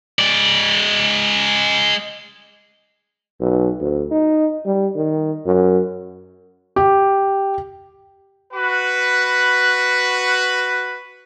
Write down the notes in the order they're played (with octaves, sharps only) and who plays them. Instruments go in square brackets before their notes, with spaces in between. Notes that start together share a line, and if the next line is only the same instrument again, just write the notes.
[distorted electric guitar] G#3 D5
[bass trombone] B1
D2
D#4
G3
D#3
F#2
[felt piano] G4
[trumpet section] F#4 B4